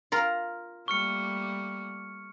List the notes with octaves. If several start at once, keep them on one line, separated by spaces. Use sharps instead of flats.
F4 A#4
G3 A3 A#3 C#6 F6 C#7